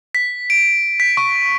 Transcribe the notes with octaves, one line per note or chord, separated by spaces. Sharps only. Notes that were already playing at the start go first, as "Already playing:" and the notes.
B6
D7
B6
C#6